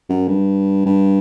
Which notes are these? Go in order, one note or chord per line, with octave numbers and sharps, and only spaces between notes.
F#2
G2
G2